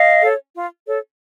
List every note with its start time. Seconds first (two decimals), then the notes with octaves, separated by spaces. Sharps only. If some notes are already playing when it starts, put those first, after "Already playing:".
Already playing: D#5 F5
0.22 A4 C#5
0.54 F4
0.86 A4 C#5